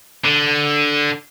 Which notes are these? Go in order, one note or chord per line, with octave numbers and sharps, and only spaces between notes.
D3